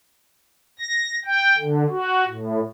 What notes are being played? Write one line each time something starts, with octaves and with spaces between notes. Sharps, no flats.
A#6
G5
D3
F#4
A2